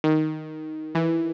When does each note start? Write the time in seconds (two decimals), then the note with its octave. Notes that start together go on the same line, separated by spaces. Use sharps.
0.04 D#3
0.95 E3